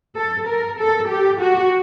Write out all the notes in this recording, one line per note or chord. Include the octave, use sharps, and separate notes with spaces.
A4
A#4
A4
G4
F#4